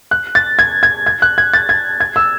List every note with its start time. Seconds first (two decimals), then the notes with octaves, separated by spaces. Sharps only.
0.11 F#6
0.35 A6
0.59 G#6
0.83 G#6
1.06 G#6
1.22 F#6
1.38 G#6
1.54 A6
1.69 G#6
2.00 G#6
2.16 E6